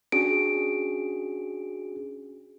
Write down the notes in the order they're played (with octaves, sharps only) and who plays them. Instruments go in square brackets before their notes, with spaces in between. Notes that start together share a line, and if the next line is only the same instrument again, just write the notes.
[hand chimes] C#4 D7 [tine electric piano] D4 F#4 G#4